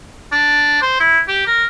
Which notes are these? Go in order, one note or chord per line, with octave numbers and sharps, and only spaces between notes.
D4
C5
E4
G4
A#4